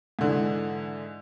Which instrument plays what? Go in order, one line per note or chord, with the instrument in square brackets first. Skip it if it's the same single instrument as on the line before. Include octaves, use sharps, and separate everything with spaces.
[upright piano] G#2 D3 E3